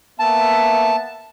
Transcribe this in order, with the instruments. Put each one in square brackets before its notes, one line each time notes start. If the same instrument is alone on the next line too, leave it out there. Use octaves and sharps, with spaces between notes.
[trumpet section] A#3 B3 E5 [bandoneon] A5